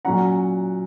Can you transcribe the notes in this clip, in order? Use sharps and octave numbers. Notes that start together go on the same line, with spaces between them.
A#2 F#3 C#4 F#5 A#5